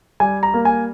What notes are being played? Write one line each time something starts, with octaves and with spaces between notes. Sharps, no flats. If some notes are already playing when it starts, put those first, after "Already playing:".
G3 G#5
A#5
A#3
G#5